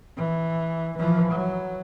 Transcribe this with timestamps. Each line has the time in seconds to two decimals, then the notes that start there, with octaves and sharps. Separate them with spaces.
0.18 E3
0.98 E3 F3
1.32 F#3